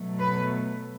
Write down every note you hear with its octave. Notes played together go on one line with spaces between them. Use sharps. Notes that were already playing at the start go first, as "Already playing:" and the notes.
Already playing: B2 F#3 A3
B4